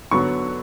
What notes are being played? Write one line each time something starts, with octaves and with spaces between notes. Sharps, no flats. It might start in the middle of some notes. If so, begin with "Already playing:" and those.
D3 F#3 B3 C#6